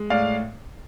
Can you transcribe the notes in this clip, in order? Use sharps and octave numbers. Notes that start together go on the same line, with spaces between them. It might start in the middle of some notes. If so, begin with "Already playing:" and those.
Already playing: G#3
A2 D5 F5